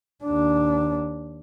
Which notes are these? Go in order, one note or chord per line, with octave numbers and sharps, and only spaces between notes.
D#2 D4